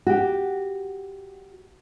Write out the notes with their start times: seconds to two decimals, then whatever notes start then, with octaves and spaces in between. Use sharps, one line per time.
0.07 F#4 G4